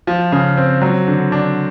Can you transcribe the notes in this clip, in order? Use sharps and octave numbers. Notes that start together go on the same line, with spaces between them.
F3
C#3
C4
F#3
D3
D4